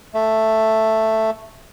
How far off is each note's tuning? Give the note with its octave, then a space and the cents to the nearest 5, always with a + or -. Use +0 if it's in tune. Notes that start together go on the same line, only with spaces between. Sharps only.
A3 +5